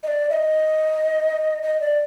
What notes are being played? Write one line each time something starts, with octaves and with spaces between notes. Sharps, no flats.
D#5
D5
E5
D#5
D#5
D5